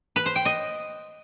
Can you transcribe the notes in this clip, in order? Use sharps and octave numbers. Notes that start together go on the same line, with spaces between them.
B4
C5
G5
D#5